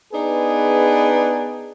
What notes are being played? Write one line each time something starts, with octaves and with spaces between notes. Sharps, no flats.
B3 D4 D#4 G#4 B4